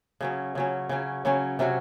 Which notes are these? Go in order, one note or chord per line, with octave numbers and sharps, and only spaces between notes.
C#3 F#3 C#4
C#3 F#3 C#4
C#3 F#3 C#4
C#3 F#3 C#4
C3 F#3 C#4 F#4